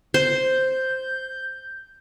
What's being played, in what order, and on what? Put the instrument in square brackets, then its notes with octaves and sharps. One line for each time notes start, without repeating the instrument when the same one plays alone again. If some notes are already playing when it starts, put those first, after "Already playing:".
[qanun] C5 [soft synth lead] G6